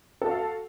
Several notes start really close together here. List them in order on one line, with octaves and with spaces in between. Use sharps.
A4 F#4 F5